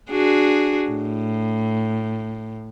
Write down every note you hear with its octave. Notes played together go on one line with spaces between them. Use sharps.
D4 F#4 G#4
A2